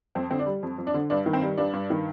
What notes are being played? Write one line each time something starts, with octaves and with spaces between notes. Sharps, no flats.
F2 C4
D3 C4
D4
G3
F2
F2
D4
D3
G2 D4
D#3
C4
G3
G2 D4
G2
D#3